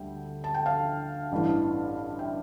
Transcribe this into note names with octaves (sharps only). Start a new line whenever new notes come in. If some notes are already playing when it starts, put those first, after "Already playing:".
Already playing: D2 D3 G3 E5 G5
A5
G5
F5 A5
A1 G2 E3
E5 G5